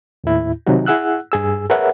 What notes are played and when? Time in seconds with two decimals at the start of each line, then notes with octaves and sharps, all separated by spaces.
0.24 D#2 A2 E4
0.67 C3 D#3 F#3 D#4 F#4
0.86 E4 G#4 F#5 E6 F#6
1.32 G2 G#4 E6
1.70 G#4 A#4 B4 C#5 E5 F#5